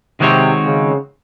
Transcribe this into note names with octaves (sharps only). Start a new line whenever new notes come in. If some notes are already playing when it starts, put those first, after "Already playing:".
C3 D#3 G#3 C4 F#4 C#5
C#3